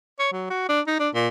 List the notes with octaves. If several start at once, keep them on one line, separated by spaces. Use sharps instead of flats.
C#5
F#3
F#4
D4
D#4
D4
A#2